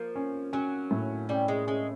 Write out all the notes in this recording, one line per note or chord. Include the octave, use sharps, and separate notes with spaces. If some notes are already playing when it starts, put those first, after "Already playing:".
Already playing: F3 A#3
C#4
F#3 C#4
A2
G3 C#4
G#3
G#3 C#4